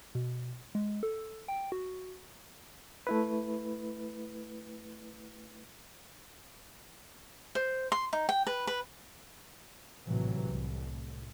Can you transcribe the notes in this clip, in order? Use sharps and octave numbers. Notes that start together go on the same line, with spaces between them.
B2
G#3
A4
G5
F#4
A3 E4 B4
C5
C6
D#4
G5
B4
B4
A#1 A2 C3 E3 F#3
C2 A2